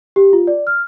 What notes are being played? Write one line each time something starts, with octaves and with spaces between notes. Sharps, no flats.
G4
F4
D5
F6